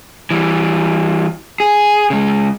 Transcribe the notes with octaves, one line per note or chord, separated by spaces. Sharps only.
E3 G3
G#4
C#3 G#3